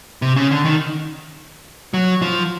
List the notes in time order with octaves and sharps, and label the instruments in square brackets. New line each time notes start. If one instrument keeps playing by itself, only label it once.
[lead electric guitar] C3
C#3
D3
D#3
F#3
F3